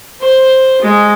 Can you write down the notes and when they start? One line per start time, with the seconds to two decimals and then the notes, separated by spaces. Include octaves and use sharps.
0.20 C5
0.82 G#3